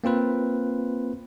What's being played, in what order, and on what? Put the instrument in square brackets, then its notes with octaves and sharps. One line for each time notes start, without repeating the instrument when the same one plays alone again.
[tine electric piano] A#3 C4 F4 B4